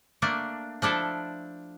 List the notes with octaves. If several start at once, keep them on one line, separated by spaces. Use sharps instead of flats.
A3 A#3 D4
F3 D4 E4 A4